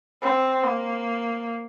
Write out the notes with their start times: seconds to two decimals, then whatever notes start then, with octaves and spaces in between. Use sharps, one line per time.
0.22 C4
0.64 A#3